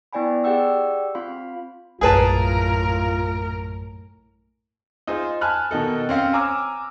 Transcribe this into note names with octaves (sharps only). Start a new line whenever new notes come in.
B3 E4 D5 G5 G#5 B5
G4 G#4 D5 F#5 G5 E6
C4 F4 F5 B5 C6
A#1 F#2 A2 F4 G#4 A#4 B4 A5
D#4 F4 G#4 C5
G#5 A5 B5 F6 F#6
B2 D#3 D#4 A4
C4 C#4 F5
G#5 A#5 D6 E6 F6